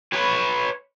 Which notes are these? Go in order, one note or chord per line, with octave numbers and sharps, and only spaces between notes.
B4 C#5